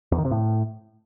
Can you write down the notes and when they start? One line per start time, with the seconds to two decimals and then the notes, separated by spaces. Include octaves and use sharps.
0.12 E2
0.18 D#3
0.25 C3
0.31 A2